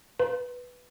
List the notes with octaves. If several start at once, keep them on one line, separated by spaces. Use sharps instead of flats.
B4